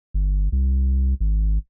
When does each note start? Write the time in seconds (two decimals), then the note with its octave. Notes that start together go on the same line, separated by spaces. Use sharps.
0.14 G1
0.52 C2
1.20 G#1